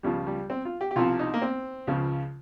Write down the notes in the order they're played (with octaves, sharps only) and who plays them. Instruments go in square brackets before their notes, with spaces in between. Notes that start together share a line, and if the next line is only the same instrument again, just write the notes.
[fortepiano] C#2 C#3 F3 G3
G3
C4
F4
G4
G4
C2 C3 F3 F4
D#4
A#3
C4
C#2 C#3 F3